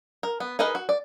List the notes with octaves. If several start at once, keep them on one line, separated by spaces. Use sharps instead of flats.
A#4
B3
D#4 G#4 A#4 B4 D#5
F#4
D5